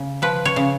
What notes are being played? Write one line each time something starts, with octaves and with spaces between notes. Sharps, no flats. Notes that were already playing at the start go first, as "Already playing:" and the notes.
Already playing: C#3
F3 B4
C#5
C#3